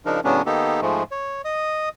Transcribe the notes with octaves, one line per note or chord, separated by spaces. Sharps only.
C#3 F3 D4 D#4 A#4
A2 C#3 F#3 B3 C#4 D4
D#3 A#3 B3 D#4 G4 A4
G#2 F3 G#3 A3
C#5
D#5 D#6